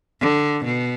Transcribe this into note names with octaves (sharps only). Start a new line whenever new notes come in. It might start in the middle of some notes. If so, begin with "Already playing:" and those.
D3
B2